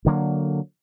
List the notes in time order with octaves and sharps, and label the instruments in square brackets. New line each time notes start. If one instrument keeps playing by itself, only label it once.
[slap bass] D2 D3 F#3 A#3